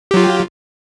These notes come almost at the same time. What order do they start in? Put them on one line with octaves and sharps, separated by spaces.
G4 F#3 F4